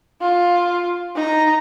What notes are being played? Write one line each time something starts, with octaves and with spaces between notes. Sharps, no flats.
F4
D#4 A#5